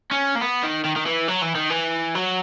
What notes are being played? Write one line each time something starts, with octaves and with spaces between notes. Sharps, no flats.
C#4
A#3
B3
D#3
D#3
D#3
E3
F#3
E3
D#3
E3
F#3